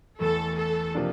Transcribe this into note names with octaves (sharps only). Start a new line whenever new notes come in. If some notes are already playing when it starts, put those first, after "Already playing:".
E2 E3 A3 A4
A4
C3 F3 A#3 D4